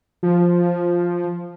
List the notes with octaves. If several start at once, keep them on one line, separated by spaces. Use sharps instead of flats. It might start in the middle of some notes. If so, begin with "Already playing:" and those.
F3